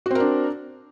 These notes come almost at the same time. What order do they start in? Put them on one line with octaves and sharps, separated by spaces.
F#4 C4 A#4 D4